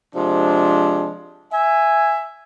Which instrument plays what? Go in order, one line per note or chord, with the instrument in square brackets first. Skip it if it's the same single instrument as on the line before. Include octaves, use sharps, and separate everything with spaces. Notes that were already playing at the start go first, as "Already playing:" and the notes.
[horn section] C3 F3 G#3 D4
E5 G#5